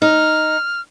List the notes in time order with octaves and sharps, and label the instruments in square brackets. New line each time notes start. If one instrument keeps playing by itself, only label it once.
[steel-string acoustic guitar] D#4 [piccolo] F6